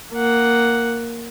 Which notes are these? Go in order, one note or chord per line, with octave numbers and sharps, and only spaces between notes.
A#3 F#5